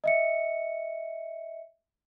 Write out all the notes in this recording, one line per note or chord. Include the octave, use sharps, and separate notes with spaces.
D#5 E5 C#7